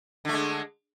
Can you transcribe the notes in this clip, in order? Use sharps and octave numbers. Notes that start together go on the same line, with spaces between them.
D3 G#3 A3